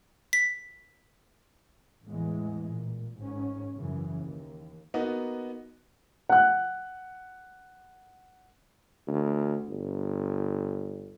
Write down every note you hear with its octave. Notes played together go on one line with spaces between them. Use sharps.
B6
A1 E2 E3 G#3
A#2
G#1 G#2 C#4
F#2 C#3 E3
D#2
A#3 B3 D#4 F#4
F#5 F#6
D2
G1